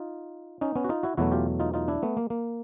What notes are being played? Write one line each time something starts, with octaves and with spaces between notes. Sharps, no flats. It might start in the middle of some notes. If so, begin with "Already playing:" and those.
Already playing: D#4 F4
C#4 D#4
B3 C#4
F#4
D#4 F4
E4 F#4
E2 B2 F#3 A3 E4 F#4
F4 G4
D#4 F4
D#4 F4
D4 E4
A3 B3
A#3
A#3